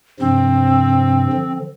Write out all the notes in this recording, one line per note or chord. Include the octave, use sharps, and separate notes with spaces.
G2 C3 F3 C4
D3 F3